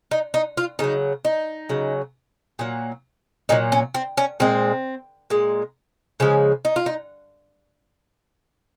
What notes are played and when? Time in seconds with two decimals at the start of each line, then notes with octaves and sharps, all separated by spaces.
0.11 D#4
0.34 D#4
0.57 F4
0.79 C#3 F#3 D#4
1.25 D#4
1.69 C#3 F#3
2.59 A#2 F#3
3.49 A#2 F#3 D#4
3.72 C#4
3.94 C4
4.17 C#4
4.40 A#2 G#3 C4
5.30 A#2 G#3
6.20 C#3 F3 G#3 C#4
6.65 D#4
6.76 F4
6.86 D#4